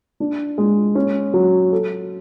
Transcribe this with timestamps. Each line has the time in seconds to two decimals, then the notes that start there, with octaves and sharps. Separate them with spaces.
0.20 D4
0.58 G#3
0.95 C#4
1.34 F#3
1.72 A4